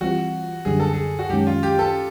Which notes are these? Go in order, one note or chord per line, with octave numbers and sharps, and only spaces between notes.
E3 G3 C4 F4 F#4
F#2 D3 G3 G#4
A4
G#4
F#4
F#2 D#3 G#3 C#4 G4
F4
G4
A4